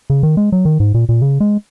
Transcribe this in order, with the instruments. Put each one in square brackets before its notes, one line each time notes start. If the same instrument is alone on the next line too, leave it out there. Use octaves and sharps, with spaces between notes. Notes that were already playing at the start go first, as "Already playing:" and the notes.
[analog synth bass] C#3
D#3
G#3
F#3
D#3
G#2
A#2
A#2
C#3
G#3